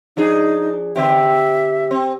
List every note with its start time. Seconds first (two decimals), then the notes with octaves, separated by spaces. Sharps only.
0.17 F3 D4 D#4 G#4
0.96 D3 C4 G4 E5
1.91 C4